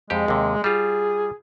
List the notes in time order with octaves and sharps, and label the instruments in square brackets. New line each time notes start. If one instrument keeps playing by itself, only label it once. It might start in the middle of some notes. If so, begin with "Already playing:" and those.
[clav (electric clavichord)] F2 G4 [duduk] G#3
[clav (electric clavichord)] D#2 C3
[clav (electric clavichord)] G3 F4 [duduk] G#4